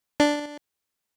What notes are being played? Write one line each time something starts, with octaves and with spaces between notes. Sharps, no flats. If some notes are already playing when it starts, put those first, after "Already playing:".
D4